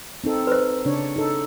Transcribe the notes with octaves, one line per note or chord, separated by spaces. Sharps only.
C4 D#4 A4
B4 C5
C#3 D4 C#5
D#4 A4